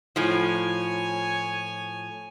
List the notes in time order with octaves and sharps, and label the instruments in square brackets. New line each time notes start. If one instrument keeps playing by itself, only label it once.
[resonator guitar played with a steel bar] A2 F3 [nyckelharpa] C#5 G#5